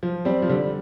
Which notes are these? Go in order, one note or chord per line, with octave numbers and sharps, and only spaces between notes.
F3
G3 C4
F3
D3 G3